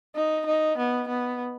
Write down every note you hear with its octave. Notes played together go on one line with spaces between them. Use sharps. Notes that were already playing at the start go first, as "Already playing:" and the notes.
D#4
D#4
B3
B3